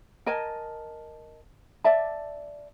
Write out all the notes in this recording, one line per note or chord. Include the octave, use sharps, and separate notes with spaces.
A#4 D#5 G#5 A5
D5 E5 A5